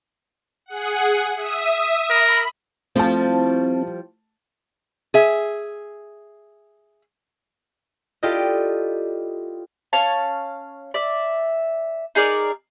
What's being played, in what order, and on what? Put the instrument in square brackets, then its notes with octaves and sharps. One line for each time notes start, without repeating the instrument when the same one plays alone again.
[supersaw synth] G#4 F#5
E5 D#6
[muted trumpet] A#4 [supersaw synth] B5
[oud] F3 G3 E4 [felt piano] A3 A5 [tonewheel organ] C4
[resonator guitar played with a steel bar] G#4 E5
[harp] E4 F4 G4 A4 D5 D#5
[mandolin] C#4 C#5 F5 A5
D5 E5
D#4 G#4 A#4 D5